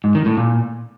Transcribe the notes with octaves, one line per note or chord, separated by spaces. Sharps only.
G#2
D#3
A2
A#2